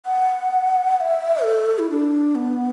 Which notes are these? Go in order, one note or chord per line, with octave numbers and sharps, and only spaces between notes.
F#5
F#5
E5
A4
E4
D4
B3